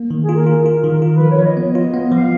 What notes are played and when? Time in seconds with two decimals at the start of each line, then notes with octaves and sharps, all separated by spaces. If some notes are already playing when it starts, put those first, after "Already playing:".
Already playing: A#3
0.11 D#3
0.20 G#4
0.29 F4 A#4
0.47 F4
0.66 F4
0.83 D#3
1.02 F4 A#4
1.16 F3 B4
1.30 C#5
1.39 F3 D#5
1.57 B3
1.75 F4
1.94 B3
2.12 F3 F5